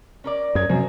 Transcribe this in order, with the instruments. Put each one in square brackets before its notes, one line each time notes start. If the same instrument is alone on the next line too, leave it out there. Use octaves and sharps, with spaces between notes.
[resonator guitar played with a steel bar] C#4 A#4 D5
[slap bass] F#2 [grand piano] D#6 G#6
[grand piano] F#2 [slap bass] C3